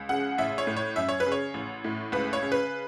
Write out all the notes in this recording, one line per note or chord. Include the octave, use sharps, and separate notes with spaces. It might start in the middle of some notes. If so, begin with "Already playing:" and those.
Already playing: C#2
C#3 F#5
A1 E5
C#5
A2
C#5
F#2 E5
C#5
B4
C#3
C#5
A1
A2
C#2 B4
C#5
C#3
B4